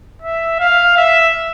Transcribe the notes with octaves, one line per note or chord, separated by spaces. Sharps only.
E5
F5
E5